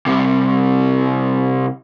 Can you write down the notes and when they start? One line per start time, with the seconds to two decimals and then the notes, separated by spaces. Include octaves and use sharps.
0.06 C2 C3